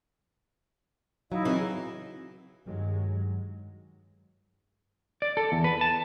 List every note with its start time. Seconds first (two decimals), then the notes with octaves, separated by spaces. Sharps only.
1.32 F#3 D#4 E4 D#5 F5
1.45 C#3 E3 C4
2.65 G2 D#3 F#3 G#3
5.22 D5
5.37 A4
5.52 E2
5.64 B4
5.81 A5